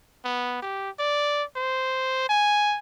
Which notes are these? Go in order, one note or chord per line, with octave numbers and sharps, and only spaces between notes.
B3
G4
D5
C5
G#5